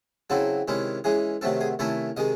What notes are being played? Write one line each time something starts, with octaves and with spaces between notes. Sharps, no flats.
C#3 F#3 C4 E4 A4
C3 D#3 G#3 C#4 E4
E3 G#3 C#4 G#4
C3 D#3 F#3 A3 C4 A4
G#4
C3 D#3 A3 C#4 E4 A4
C3 D#3 G#3 D#5